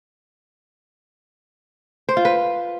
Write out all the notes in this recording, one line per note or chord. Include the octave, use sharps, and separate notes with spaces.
C5
F4
B4